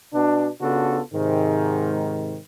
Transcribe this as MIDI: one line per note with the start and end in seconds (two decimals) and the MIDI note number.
0.14 0.49 47
0.14 0.49 62
0.61 1.00 49
0.61 1.00 59
0.61 1.00 62
0.61 1.00 65
0.61 1.00 66
0.61 1.00 69
1.14 2.38 44
1.14 2.38 48
1.14 2.38 51